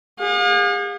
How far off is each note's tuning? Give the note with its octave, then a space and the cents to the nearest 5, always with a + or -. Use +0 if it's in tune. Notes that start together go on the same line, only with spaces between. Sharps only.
G#4 -40 F5 +45